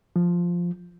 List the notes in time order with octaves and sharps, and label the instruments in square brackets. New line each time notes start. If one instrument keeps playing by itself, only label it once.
[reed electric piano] F3